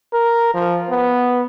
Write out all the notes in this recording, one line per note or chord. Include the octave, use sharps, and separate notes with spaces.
A#4
F3
B3